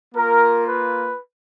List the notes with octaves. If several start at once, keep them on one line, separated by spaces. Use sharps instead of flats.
A#3 F4 A#4
B4